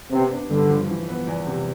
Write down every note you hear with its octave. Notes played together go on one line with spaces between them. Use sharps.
C3 B3
D4
G2 D3
F3
E3
B3
E2
C3